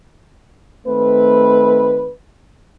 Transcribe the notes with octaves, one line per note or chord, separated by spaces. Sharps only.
D#3 A3 C4 B4